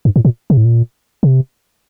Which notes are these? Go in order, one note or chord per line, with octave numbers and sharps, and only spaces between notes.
G2
A2
A#2
C3
A2
A#2
C3